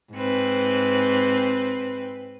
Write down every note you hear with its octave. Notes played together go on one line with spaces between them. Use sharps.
G#2 C4 B4